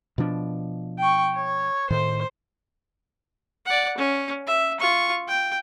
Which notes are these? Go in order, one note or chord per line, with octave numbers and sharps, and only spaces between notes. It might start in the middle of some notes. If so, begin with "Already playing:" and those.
B2 F3 D4
G5 C#6
C#5
A2 D#3 C5
D5 F#5
C#4
E5
F4 C#6
G5